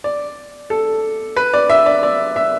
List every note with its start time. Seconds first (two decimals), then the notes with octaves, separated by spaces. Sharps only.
0.04 D5
0.70 A4
1.37 B4
1.54 D5
1.70 E5
1.86 D5
2.03 D5
2.36 E5